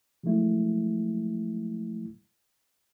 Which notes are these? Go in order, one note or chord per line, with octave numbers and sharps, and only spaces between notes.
F3 F#3 G#3 A3 E4